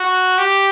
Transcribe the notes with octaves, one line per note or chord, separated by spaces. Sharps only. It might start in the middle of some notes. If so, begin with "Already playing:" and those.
Already playing: F#4
G4